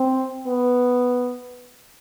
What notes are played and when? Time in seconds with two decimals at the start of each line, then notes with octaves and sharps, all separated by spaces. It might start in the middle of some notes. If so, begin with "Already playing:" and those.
Already playing: C4
0.47 B3